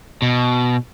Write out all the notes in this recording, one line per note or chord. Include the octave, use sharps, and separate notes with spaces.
B2